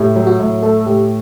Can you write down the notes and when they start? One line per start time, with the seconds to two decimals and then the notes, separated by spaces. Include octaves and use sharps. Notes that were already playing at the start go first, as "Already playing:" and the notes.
Already playing: A2 G4
0.16 F#3
0.27 F#4
0.39 A2
0.63 A3 A4
0.86 A2 G4